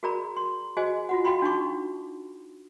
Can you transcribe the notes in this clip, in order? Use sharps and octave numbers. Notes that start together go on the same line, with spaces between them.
F#4 G#4 A#4 D5 A#5 B5
C6
F#4 G#4 C5 D#5 G#5
F4 F#4 F#5
F#4 F5 G5 B5 C6
D4 D#4 F#4 C#6 D6